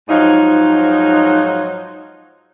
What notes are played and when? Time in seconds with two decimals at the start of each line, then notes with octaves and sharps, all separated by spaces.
0.08 G#2 F3 F#3 D#4